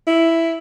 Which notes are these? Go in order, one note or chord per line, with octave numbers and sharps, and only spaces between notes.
E4